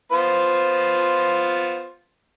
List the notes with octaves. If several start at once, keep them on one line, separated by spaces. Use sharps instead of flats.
B3 F4 C5